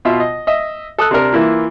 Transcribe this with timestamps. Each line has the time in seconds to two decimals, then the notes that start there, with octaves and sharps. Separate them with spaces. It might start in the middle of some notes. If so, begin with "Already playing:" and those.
0.05 B2 F4 E5
0.20 D#5
0.47 D#5 E5
0.98 A4 D#6 F#6
1.11 C3 D4 A#4
1.33 E3 A#3 E4 F4